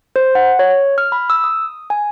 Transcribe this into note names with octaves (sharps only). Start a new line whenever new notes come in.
C5
F#5
C#5
F6
B5
E6
D#6
G#5